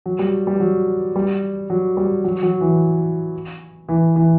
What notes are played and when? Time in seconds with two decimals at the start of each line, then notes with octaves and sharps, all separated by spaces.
0.06 F#3
0.19 G3
0.47 G3
0.60 F#3
1.16 G3
1.70 F#3
1.97 G3
2.24 F#3
2.43 F#3
2.61 E3
3.89 E3
4.16 E3